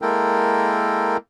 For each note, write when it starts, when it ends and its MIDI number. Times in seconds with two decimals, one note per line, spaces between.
0.02 1.17 56
0.02 1.17 58
0.02 1.17 64
0.02 1.17 69
0.02 1.17 70
0.02 1.17 79